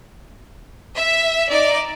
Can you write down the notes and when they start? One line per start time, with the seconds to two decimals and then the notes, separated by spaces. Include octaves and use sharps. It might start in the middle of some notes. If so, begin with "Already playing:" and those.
0.96 E5
1.49 D#4 D5